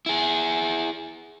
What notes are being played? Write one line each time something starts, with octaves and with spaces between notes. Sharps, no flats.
E4 G#4